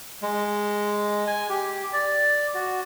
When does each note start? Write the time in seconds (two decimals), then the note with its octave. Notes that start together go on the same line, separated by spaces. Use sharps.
0.22 G#3
1.27 G#5
1.49 G4
1.93 D5
2.54 F#4